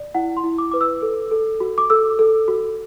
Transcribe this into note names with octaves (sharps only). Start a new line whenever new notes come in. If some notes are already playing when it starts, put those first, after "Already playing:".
Already playing: D5
E4 F#5
C6
E4
D6
B4 D6
E6
A4
A4
F#4
D6
A4 E6
A4
F#4